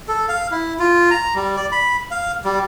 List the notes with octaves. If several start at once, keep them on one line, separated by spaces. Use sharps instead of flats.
A4
F5
E4
F4
A#5
G3
D5
B5
F5
G3